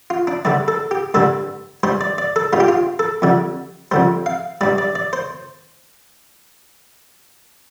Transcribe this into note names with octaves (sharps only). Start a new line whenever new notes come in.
F4
D4
G2 D3 G3 D5
A4
G4
G2 D3 G3 A4
G2 G3 C5
D5
D5
A4
G2 G3 F4
G4
F4
A4
F2 D3 G3
F2 D3 G3 C5
F5
G2 G3 D5
D5
D5
C5